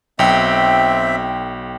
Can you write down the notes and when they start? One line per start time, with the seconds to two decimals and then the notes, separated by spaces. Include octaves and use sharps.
0.19 B1 C4 E5 G5